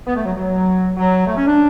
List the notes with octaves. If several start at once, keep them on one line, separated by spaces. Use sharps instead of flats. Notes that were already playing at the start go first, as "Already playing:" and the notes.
B3
A3
F#3
F#3
F#3
A3
C#4
D4